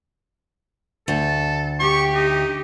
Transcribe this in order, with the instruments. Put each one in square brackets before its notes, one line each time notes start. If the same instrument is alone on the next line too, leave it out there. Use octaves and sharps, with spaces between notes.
[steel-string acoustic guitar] D2 [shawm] A4
[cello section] G4 [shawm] C#6
[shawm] D#4